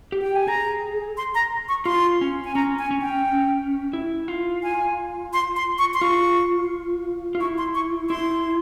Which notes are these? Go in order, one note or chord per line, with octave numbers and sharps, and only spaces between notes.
G4
G5
G#5
G#4 A#5
C6
A#5
C#6
F4 C6
C#4
G#5
C#4 A#5
G#5
C#4
G5
E4
F4
G#5
C6
C6
C#6
C6
F4 C#6
F4
E4 C#6
C6
C#6
E4 C6